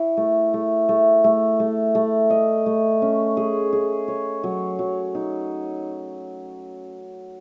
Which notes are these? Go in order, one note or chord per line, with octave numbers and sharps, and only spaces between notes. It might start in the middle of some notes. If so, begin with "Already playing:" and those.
Already playing: E4 C#5
A3
A3
A3
A3
A3
A3
D#5
A3
C#4
G#4
G#4
C#5
F#3
F#3
D#4